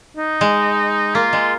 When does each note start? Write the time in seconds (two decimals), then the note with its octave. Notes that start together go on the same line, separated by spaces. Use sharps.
0.17 D#4
0.41 G#3
1.15 A#3 F4
1.33 G#3